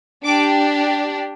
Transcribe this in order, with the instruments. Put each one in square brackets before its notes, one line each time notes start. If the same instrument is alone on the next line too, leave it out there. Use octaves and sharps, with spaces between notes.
[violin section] D4 G4 D6